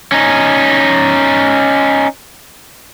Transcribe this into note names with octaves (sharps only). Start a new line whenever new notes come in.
C#4 D#4